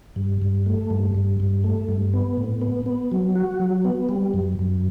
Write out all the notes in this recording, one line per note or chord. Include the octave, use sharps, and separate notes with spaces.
G2
G2
A3
G2
G2
G2
A3
G2
B3
A2
B3
B3
F#3
F#4
F#3
B3
G3
F#2
F#2